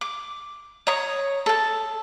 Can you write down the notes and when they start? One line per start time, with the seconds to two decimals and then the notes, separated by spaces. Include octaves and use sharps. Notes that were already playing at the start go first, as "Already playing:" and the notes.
0.01 D6
0.87 C#5 A#5 D#6
1.46 A4 A5